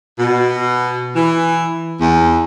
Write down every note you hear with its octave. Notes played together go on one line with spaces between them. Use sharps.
B2
E3
E2